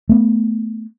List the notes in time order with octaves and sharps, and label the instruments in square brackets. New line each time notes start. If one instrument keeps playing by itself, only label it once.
[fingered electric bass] A3 B3